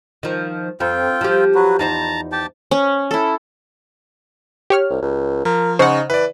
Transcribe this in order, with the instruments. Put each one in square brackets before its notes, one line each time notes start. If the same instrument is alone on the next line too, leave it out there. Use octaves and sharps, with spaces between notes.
[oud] D#3 F3
[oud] F2 [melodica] C4 F4 G5
[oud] F3 G4
[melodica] F#3 F#4 B4
[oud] E2 D#4 C5 [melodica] A5 A#5
[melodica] G4 G5 A5
[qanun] C#4
E4 A4
[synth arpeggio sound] G4 C#5 F6
[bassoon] C2
C#2
[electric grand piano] F3 [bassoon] A#4
[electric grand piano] C#3 G#5 C#6 [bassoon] D#4 [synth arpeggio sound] C5 F#5
[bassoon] E3 [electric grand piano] B4 D5